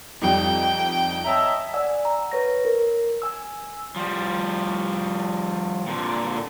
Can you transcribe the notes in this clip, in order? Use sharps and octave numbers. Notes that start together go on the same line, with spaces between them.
F2 G3 D#4 G5
C#5 D#5 E5 A5 A#5
D5 F#5 G#5 E6
A#5
B4 C#5 A#6
A#4
G#5 E6
F3 G3
A#2 D3